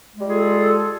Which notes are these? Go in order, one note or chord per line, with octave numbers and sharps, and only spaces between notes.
G3 G#3 F4 G#4 A4